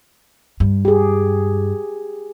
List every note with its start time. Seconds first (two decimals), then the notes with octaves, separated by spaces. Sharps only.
0.60 G2
0.85 G4 G#4